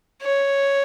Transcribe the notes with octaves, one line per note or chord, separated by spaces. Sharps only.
C#5